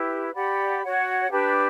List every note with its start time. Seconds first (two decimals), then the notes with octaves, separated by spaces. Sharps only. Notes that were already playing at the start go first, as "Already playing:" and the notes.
Already playing: E4 G4 B4
0.34 G4 D5 F#5 B5
0.82 F#4 C#5 F#5
1.30 D4 G4 B4